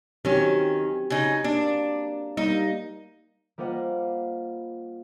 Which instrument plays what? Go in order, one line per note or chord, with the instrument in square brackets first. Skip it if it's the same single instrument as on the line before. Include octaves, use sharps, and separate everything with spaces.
[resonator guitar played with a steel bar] D#3 C#4 [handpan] F#3 C4 G4
[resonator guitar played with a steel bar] C#3 D#4
[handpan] A#3 [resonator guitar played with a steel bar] D4
[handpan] G3 A#3 [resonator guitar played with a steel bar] D#4
[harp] G3 A#3 F4 C5 D#5 F#5